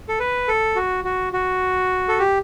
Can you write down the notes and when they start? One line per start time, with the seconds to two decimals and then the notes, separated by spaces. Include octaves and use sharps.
0.08 A4
0.20 B4
0.48 A4
0.76 F#4
1.05 F#4
1.33 F#4
2.09 A4
2.19 G4